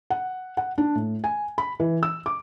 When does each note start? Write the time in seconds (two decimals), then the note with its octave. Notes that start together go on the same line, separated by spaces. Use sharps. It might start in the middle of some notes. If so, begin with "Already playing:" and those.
0.10 F#5
0.57 F#5
0.78 D4
0.95 A2
1.24 G#5
1.58 B5
1.80 E3
2.03 E6
2.26 D6